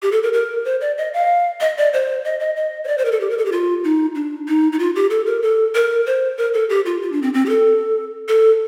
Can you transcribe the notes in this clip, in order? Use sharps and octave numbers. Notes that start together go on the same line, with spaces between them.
G4
A4
A#4
A#4
C5
D5
D#5
F5
D#5
D5
C5
D#5
D#5
D#5
C5
D5
C5
A#4
A4
G4
A#4
A4
G4
F4
D#4
D4
D#4
D#4
F4
G4
A4
A#4
A4
A#4
C5
A#4
A4
G4
F4
F4
D4
C4
C4
G4
A4
A4